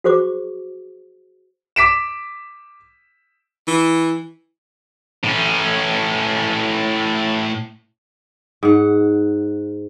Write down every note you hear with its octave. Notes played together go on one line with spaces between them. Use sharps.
F#4 G#4 C5 C#6 D6
D6 B6 D7 E7
E3
A2 C#4
G#2 F#5